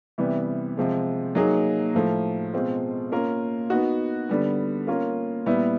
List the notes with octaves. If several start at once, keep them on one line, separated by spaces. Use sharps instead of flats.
C3 E3 G3 B3
C3 F3 G#3
F#3 A#3 D#4 G#4
A2 F3 A3
B2 G#3 C4 F4
A#3 C#4 F4 A#4
B3 D#4 F#4
D3 G3 B3
A#3 C#4 F4 A#4
A#2 G3 B3 E4